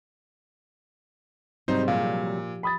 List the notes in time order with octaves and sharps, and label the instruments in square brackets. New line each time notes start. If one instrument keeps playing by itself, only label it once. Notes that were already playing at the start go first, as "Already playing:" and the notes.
[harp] G#2 [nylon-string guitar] C3 F#3 G3 [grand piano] C4 [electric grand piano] D#4 C5
[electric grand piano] A#2 [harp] F3 G4 [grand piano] F5
[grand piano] B5 D#6 A6